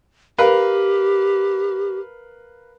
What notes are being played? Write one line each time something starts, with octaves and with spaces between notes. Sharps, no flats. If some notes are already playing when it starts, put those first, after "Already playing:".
G4 A#4 B4 F5